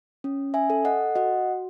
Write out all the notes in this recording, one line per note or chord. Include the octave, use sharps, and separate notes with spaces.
C#4
E5 G#5
A4
D#5 F#5
F#4 D#5 F#5